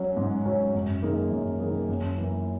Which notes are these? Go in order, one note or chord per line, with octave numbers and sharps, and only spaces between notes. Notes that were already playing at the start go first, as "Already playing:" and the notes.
Already playing: F#3 C#4
G#2
F#3 C#4
F#2
D#3 A#3 D#4 G#4
F#2
D#3 A#3 D#4 G#4
F#2
E3 A#3